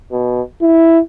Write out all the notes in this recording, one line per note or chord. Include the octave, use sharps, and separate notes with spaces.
B2
E4